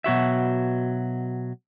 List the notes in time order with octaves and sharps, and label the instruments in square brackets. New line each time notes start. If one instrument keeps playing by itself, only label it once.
[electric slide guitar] B2 F#3 F#4 E5